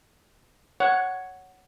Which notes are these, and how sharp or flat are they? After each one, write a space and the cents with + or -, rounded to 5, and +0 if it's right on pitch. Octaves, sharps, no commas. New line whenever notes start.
C#5 +0 F#5 +5